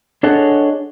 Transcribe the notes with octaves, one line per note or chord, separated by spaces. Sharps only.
D4 G#4 A4 C#5 D#5 F#5